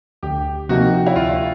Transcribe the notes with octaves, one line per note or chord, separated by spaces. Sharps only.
D2 G4
C3 F3 A#3 D#4 F#4
E4
D2 F4